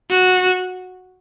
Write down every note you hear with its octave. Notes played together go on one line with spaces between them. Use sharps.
F#4